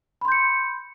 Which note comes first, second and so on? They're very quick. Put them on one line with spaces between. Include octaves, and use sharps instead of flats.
B5 C6 G6 C#7